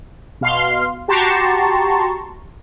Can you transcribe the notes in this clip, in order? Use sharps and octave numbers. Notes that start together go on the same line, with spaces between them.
B2 F5 C6
F#4 G4 A5 A#5 C6 C#6